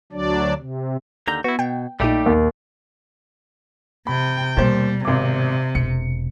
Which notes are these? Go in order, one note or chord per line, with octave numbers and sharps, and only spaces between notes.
D2 F#3 D4 D5
C3
D#2 D3 A#5 G6
B3 E4 F#4
B2 G5
A#1 A#2 G3 A3 D#4 G4
D#2
C3 G5 B5
D#2 B2 G3 C5
G#1 C3 D6
E1 C#7